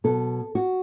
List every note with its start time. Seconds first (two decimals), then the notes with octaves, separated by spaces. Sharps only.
0.04 B2 F#3 B3 A4
0.55 F#4